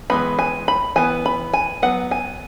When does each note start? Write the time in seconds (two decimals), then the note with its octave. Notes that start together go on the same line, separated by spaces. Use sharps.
0.10 E3 G#3 B3 B5
0.39 G#5
0.68 B5
0.96 E3 B3 G#5
1.26 B5
1.53 G#5
1.82 F#3 B3 F#5
2.11 G#5